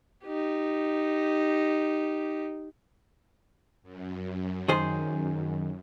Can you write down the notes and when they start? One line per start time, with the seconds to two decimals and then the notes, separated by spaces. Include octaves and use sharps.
0.25 D#4 G4
3.83 F#2
4.68 D#3 G#4 C5